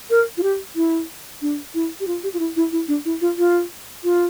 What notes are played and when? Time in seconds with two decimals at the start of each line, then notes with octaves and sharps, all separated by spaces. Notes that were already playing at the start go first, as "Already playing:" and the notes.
0.10 A#4
0.37 F4
0.43 G4
0.76 E4
1.42 D4
1.74 E4
2.00 G4
2.07 F4
2.23 G4
2.34 F4
2.39 E4
2.56 E4
2.72 E4
2.88 D4
3.05 E4
3.21 F4
3.38 F4
4.04 F4